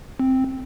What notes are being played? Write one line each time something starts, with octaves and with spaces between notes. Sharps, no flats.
C4